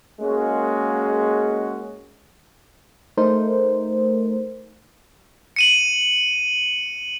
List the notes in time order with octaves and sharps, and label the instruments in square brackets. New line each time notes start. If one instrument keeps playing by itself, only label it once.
[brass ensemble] G#3 A#3 C#4 F#4
[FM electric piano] A3 D#4 A#4 C5
[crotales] C#7 D#7 F#7